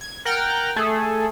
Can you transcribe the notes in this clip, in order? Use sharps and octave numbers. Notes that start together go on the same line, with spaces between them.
G#6
A#4 F#5 G5 F6 A6
A3 G#4 A4